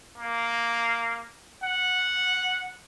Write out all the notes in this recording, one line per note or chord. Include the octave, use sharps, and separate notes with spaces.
A#3
F#5